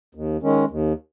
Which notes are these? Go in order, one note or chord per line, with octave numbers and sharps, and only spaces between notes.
D#2
D#3 G#3 C#4
D#2